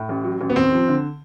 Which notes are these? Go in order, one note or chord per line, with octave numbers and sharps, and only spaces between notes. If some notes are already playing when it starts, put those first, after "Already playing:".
Already playing: A2
A1
F#3
A1
B3
D#2 C4
F3
D3